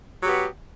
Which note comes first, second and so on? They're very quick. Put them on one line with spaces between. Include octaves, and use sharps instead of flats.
F#3 G4 B3